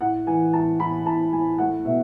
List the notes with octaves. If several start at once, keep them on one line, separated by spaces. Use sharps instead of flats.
A2 F#5
E3 G#5
A2 A5
A2 B5
A2 A5
A2 G#5
A3 F#5
B2 E5